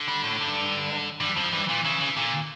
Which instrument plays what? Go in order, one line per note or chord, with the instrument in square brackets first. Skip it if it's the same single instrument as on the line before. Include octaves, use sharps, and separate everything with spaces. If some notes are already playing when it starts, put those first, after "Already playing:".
Already playing: [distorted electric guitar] D3
[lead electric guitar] G3
A2
G2
[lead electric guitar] G2 [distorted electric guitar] E3
[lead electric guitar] F2 [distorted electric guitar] F3
[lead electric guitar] G2 [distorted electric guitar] E3
[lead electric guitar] A#2 [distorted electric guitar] E3
[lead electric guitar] C#3 [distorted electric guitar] E3
[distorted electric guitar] E3
[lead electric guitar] A#2 [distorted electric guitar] D3